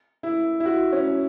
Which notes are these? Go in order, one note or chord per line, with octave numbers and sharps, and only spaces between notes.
E4
E4
F#4
C#4